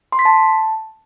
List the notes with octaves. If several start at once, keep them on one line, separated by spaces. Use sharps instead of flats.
C6
B6
A5